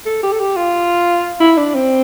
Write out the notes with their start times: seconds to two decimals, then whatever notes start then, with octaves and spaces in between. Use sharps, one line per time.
0.06 A4
0.23 G4
0.32 A4
0.40 G4
0.56 F4
1.40 E4
1.57 D4
1.75 C4